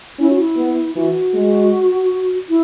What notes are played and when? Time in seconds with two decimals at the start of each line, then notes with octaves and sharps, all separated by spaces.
0.19 C#4 E4
0.29 F#4
0.39 E4
0.57 B3
0.95 E3 F#4
1.33 G#3
2.49 E4